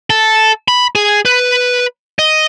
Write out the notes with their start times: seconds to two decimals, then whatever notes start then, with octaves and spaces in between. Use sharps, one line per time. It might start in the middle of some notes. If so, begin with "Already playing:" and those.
0.10 A4
0.68 B5
0.95 G#4
1.25 B4
2.19 D#5